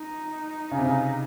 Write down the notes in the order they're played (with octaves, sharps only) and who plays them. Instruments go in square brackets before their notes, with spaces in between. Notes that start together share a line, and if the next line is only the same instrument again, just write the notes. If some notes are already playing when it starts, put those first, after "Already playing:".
Already playing: [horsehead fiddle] D#4
[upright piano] C#3
C3
C#3